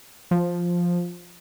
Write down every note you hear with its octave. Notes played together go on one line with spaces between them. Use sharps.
F3